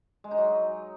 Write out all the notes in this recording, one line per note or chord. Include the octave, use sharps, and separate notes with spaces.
G#3
D#4
F#3